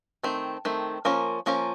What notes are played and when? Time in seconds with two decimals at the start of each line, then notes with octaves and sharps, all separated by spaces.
0.24 D#3 A3 C4
0.65 D#3 A3 C4
1.05 F3 A#3 C#4 F4 A#4
1.46 F3 A#3 C#4 F4 A#4